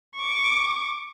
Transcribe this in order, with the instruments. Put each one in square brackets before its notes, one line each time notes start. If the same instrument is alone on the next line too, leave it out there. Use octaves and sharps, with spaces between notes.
[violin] C#6 D6